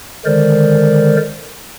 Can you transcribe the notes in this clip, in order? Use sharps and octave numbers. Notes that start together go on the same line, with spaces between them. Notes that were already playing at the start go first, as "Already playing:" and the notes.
D3 D#3 G#3 A#4 C5 D5